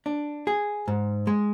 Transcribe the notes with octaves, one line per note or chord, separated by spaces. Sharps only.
D4
G#4
G#2
G#3